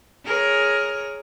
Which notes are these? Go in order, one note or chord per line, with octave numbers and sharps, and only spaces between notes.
G#4 A#4 C#5